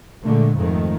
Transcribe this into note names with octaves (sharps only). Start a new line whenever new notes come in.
A#2 D3 G#3 A3
F2 G#2 D#3 A3